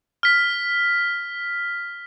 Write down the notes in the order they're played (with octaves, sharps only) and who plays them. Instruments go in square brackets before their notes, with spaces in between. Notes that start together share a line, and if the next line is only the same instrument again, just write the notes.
[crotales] F6 B6